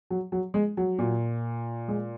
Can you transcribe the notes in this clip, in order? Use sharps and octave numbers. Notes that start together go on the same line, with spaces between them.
F#3
F#3
G#3
F#3
A#2
G#3